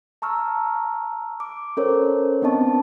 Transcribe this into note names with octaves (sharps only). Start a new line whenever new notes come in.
A5 A#5 C#6 E6 F6
D6
C#4 A4 A#4 C5 C#5
B3 C4 D4 D#5 A5 C#6